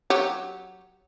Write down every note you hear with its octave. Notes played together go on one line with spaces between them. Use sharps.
F#3 G4 C#5